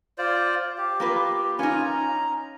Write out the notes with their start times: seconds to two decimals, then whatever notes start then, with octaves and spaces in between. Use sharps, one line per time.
0.18 F4 C5 D5
0.78 G4
1.00 A#3 F4 B4
1.59 C#4 D#4 F4 G#5
1.83 A#5